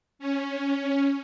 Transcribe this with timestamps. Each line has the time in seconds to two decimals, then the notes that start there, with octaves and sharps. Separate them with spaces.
0.19 C#4